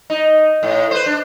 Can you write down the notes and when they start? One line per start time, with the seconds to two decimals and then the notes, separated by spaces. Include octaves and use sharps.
0.10 D#4
0.63 A2
0.91 B4 C5
1.06 D4